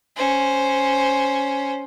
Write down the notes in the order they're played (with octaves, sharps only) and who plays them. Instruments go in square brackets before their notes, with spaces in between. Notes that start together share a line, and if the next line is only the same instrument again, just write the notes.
[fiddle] C#4 C5